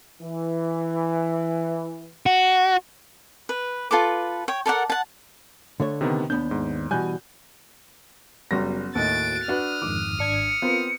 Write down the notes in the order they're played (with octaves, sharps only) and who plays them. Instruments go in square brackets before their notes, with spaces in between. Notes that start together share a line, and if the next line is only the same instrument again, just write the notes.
[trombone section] E3
[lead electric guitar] F#4
[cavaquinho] B4
F4 A4 B4 D6
C#5 G5
A4 A#4 D5 F#5
F#5 A5
[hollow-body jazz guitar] D3 A3 C#5
[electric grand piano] C3 D#3 B3
[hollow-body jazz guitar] D#2 B3 D4 [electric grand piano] G6
[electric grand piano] G#2
[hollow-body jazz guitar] B2 E3 G3 [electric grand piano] G#5 F#6 G6
[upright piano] F#1 G3 A#6 [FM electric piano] B3 F#4
[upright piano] D#2 A2 D#5 [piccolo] F#6 [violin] A6 D7
[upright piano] D4 F#4 B4 [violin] D#6 F6
[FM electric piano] F2 G#2 D#3 [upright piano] D6
[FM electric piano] G#1 D4 G#6 [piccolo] C#7
[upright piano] B3 C4 [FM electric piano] F4 A#4